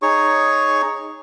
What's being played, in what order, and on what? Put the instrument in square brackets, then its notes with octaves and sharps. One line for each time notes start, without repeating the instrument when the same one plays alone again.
[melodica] D#4 G#4 C#5 C#6